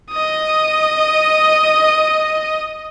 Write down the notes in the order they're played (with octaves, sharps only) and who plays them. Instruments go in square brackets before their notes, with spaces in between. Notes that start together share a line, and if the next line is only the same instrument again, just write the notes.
[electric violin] D#5 D#6